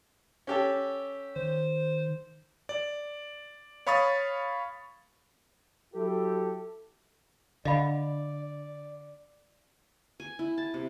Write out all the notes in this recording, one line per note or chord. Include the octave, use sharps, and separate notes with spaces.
C#4 G4 A4
D#3 C5
D5
C#5 F5 B5 C#6 D#6 A6
F#3 E4 G4 A4
D3 D5 D#5 F5 B5
G#5
E4
A5
C3